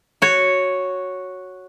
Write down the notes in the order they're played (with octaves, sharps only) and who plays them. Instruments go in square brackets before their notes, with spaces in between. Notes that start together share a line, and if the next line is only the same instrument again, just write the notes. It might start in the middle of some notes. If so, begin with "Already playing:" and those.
[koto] F#4 C#5